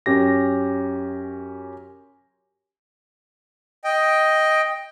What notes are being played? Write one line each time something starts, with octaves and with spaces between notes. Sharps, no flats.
F#2 C#4 G4 A#6
D#5 G5